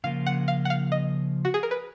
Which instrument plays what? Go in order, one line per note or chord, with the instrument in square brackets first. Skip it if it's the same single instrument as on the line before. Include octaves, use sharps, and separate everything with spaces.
[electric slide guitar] C#3 F3 A#3 F4 [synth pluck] F5
[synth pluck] F#5
F5
F#5
F5
D#5
F#4
G#4
A#4
B4